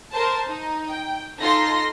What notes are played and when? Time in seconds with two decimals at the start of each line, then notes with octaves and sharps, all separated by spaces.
0.12 A#4 C5 A5
0.47 D#4
0.90 G5
1.39 D#4 F4 A4 C6 A#6